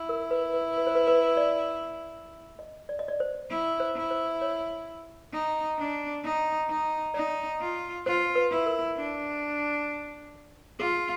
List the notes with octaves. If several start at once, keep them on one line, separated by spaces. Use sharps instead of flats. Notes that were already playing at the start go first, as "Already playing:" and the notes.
Already playing: E4
A#4
B4
B4
B4
C5
B4
B4
D5
D#5
D5
D#5
D5
C5
E4
C5
E4
C5
C#5
D#4
D4
D#4
D#4
D#4 D5
F4
F4 C5
B4
E4
A#4
D4
F4 G#4